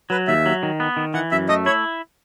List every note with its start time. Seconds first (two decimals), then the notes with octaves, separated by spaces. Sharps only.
0.10 F#3 B4
0.28 D#2 E5
0.46 F#3
0.63 D#3
0.80 B3
0.97 D#3
1.14 E3 F#5
1.31 F#2 E5
1.49 A3 D#5
1.66 E4 C#5